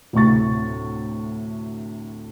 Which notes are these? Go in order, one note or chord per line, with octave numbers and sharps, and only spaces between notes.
D2 A2 C3 C#6 A6